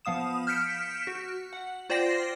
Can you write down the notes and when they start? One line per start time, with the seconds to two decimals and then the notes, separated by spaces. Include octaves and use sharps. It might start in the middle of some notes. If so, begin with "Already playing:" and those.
0.05 F3 B3 F5 D#6 E7
0.47 F6 G6 B6 C#7 D7 E7
1.07 F#4
1.53 F#5
1.90 F4 C5 D5 G5 A#6 C7